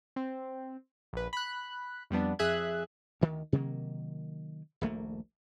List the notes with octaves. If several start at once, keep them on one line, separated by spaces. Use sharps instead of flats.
C4
A#1 B4
B5 F#6
F2 G3 B3 D4
F2 G#4 E5 F#6 G#6
D2 D#3
C3 D#3 F#3 A#3
D#1 A#1 A3 A#3